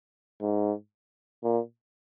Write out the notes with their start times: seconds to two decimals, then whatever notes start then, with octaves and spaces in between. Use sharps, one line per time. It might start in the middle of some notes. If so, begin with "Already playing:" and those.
0.42 G#2
1.44 A#2